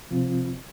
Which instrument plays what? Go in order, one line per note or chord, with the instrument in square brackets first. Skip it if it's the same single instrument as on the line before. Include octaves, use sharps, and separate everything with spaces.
[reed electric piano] C3 F3 C4 F4